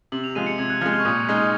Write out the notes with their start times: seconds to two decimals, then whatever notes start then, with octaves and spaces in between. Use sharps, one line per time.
0.12 C3 F#7
0.24 F7
0.35 F3 G#3 D#7
0.47 C#7
0.58 C3 G#6
0.70 F#6
0.81 F3 F6
0.86 G#3
0.94 F6
1.00 C#6
1.05 A#2 D#6
1.29 G#3 D#4